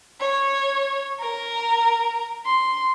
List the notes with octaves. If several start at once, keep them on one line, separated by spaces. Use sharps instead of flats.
C#5
A#4
C6